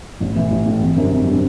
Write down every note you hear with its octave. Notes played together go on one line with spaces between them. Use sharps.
A1
A2 E3
A1
A2 E3
G#1
F#2 D3 G3 C4
G#1
D3 G3 C4